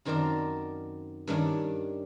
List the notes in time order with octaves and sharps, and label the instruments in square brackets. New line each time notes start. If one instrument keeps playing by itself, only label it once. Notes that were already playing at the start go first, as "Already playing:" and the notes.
[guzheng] F#2 D#3 C4 A#4 D5 A5
G2 D#3 C#4 D4